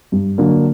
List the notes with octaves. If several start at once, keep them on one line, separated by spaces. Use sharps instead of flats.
G2
D3 F#3 A#3 D4